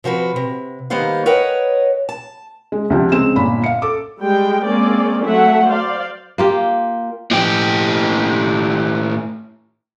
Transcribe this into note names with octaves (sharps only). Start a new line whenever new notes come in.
C3 F3 F#4 B4
C3
D#3 G3 A#3 B3 C5 F5
A#4 B4 C#5 D#5 F#5 G5
A5
G#3
D2 C3 F3
C#3 G#3 C4 E7
G1 A#2 B5
F5 C#7
A4 D6
G3 G#3 G5
G#3 A#3 C4 C#4 D5
F#3 A3 E5 F#5
C5 D5 F5
A#3 F4 G4
A2 G4